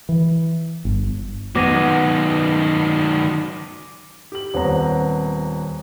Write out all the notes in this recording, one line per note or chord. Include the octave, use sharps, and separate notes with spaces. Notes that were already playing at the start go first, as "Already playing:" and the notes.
E3
G1
D#3 F#3 B3 D6 A#6 D#7
G4 F#7
D#1 B3 C4 C#5 A#5